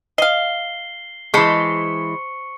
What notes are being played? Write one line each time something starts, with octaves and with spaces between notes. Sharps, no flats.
D#5 F5 C7 G7
E3 G#3 C5 A5 B5 C#6 C#7